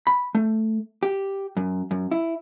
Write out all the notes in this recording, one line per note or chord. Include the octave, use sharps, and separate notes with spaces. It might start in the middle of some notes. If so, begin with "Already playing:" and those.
B5
A3
G4
F#2
F#2
E4